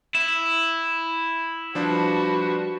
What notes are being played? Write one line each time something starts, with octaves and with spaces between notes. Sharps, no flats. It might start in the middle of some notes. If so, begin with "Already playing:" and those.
E4 E7
F3 G3 D4 F#4 B4